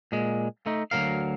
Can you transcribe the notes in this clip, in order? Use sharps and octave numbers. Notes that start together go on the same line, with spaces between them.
A#2 G#3
A3 D#4
D2 D#3 F#3 A#4 F5